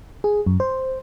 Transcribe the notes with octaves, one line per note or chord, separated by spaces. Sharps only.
G#4
F#2
C5